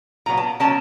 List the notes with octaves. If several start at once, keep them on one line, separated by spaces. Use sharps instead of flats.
A#2 F#3 B3 A#5
A5
B2 F#3 A#3 C#4 A5